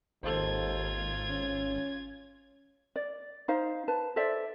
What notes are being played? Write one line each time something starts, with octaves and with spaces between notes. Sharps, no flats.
G#1 D#2 F4 A4 C5 G#6
C#4
D5
D#4 C5 F5
B4 A5
A4 C5 D5 E5